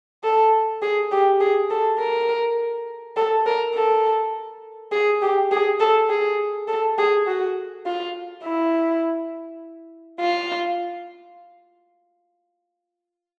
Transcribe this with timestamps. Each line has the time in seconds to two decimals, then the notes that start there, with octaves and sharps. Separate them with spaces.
0.23 A4
0.82 G#4
1.12 G4
1.40 G#4
1.70 A4
1.99 A#4
3.17 A4
3.46 A#4
3.75 A4
4.92 G#4
5.22 G4
5.52 G#4
5.80 A4
6.09 G#4
6.68 A4
6.98 G#4
7.27 F#4
7.86 F4
8.44 E4
10.20 F4